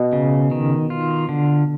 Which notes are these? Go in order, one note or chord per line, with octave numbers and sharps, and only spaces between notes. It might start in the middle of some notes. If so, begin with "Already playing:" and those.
Already playing: B2
C#3
D#3
F4
D3